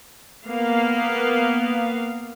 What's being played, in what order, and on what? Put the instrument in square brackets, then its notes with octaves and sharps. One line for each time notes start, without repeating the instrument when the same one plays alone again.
[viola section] A#3 B3 F5